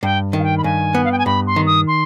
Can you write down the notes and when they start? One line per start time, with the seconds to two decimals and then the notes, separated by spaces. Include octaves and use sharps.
0.03 G2 G5
0.33 D#3
0.39 F5
0.43 G5
0.58 B5
0.64 G2 G#5
0.95 B3
1.04 F5
1.12 G5
1.18 G#5
1.26 G2 B5
1.47 C6
1.56 D#3
1.66 D#6
1.87 C6